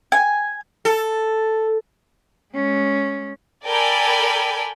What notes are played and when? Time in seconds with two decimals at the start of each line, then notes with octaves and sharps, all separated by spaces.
0.12 G#5
0.85 A4
2.55 G#3 C#4
3.66 A4 A#4 D5 G5 G#5 B5